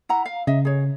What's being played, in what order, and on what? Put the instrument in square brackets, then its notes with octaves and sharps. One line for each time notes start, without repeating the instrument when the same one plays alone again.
[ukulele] E4 F#5 A#5
F5
[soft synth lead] C#3 [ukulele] D#5 E5
[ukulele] G#4 C#5